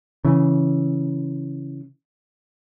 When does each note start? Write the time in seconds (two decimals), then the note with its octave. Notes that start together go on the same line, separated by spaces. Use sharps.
0.25 C#3 E3